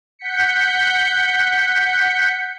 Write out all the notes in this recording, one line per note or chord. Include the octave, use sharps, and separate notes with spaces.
F#5 G6 B6 C#7